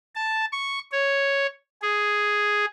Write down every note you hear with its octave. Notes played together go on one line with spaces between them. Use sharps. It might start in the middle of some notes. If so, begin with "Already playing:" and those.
A5
C#6
C#5
G#4